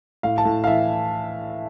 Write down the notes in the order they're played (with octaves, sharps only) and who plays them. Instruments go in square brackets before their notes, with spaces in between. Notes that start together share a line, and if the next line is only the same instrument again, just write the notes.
[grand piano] A2 F5
A5
A2
F5
E3 E5